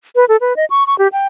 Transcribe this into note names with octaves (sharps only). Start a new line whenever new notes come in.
B4
A4
B4
D#5
C#6
C#6
G4
G5